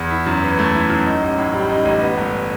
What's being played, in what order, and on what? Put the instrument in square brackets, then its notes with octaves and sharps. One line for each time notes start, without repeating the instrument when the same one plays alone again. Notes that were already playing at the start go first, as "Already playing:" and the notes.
Already playing: [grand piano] E2
E4
F#2
E3
A3
E4
F#2
D#4
A1
A2
G3
D#4
A1
B3
G1